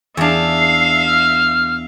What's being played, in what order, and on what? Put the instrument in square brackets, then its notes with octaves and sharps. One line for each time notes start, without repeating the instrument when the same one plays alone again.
[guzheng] E2 D4 [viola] E5 F5
[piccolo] C7
F6